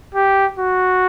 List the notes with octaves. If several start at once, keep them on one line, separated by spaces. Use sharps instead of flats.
G4
F#4